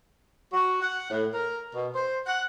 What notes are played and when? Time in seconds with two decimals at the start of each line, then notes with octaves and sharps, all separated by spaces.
0.53 F#4
0.82 F#5
1.11 A2
1.33 A#4
1.75 B2
1.95 C5
2.26 F#5